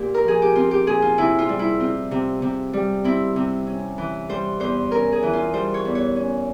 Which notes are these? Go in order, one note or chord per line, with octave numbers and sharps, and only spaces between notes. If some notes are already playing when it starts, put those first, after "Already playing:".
Already playing: A#2 F4 G4
A#4
F3 G#4
G4
C4 F4
G4
A#2 G#4
F4
C3 E4
F4
G3
E4
C4 F4
C3
C3
G3
C4 E4
C3
C#4
E3
G3 C5
E2 C5
C#4 A#4
G#4
E3
F4
G3 C5
C#5
E2
C#5
C#4